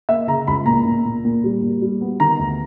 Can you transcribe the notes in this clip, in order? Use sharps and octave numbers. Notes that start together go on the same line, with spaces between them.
A#3 E5
C#3 A#5
C#2 B5
A#2 A#5
A#2
A#2
A#2
G3
A#2
G3
B3
D#3 A#5
D2